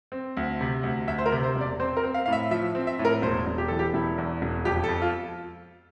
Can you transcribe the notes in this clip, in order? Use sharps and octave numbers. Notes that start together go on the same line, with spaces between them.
C4
D2
C3
D2
D2 E5
C5
A#4
C3
C5
E1
D5
C4 C5
A#4
C4
F5
A2 F5
E5
F3 E5
C4
E5
A2
A#4
E1 C5
E1
G4
E3 A4
G4
E1 E4
E2
E1
F2 G4
A4
F2
F4